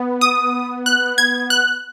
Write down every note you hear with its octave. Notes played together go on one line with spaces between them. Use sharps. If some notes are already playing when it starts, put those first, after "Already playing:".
Already playing: B3
D#6
F#6
G#6
F#6